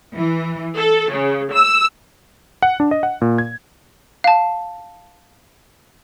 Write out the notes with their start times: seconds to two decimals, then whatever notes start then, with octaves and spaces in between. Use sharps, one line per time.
0.15 E3
0.77 A4
1.12 C#3
1.53 E6
2.62 F#5
2.80 D4
2.91 D#5
3.03 F#5
3.22 A#2
3.38 G#6
4.24 F5 A5